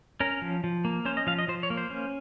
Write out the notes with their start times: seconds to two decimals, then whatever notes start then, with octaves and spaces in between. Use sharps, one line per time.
0.20 C#4 A#4
0.42 F3
0.64 F3
0.85 A#3
1.05 C#4 C5
1.17 D#5
1.27 F3 F5
1.38 D#5
1.48 F3 C5
1.63 C#5
1.70 A#3
1.77 C5
1.90 C#4